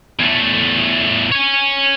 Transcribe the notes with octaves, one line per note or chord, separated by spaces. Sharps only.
E2 A3
C#5 G#5